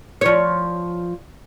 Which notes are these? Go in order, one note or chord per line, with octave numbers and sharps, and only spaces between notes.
F3 C#5